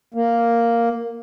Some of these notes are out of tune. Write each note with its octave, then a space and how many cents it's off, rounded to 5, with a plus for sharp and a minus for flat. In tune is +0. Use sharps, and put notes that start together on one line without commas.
A#3 +0